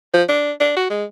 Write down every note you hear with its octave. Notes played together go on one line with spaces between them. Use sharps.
F3
D4
D4
F#4
G#3